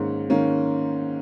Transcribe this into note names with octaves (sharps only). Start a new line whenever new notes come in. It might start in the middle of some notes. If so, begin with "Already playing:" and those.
Already playing: G#2 D#3 A#3 C#4
D#3 A#3 C#4